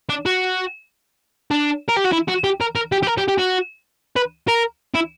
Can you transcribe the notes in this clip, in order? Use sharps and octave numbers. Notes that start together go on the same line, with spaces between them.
D4
F#4
D4
A#4
G4
F#4
E4
F#4
G4
A#4
A#4
G4
G4
A#4
G4
G4
F#4
B4
A#4
E4